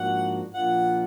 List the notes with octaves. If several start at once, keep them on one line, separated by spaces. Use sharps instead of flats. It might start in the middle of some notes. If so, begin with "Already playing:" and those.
Already playing: G#2 F3 A#3 D4 F#4 F#5
A#2 F3 A#3 D4 F4 F#5